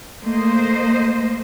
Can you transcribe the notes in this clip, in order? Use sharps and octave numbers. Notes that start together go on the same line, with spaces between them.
A3 A#3 C5 D#5